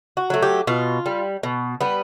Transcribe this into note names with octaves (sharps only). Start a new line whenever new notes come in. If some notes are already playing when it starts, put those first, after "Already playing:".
F#4
F#3 A3
G4
B2 F4
G3
B2
G3 B3